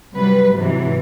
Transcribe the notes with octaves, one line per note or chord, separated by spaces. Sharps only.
C3 F#3 G3 B4
G#2 C3 E3 F#3